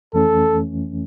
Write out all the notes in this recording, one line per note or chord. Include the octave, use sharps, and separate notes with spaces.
F2 E3 A3 C#4 A4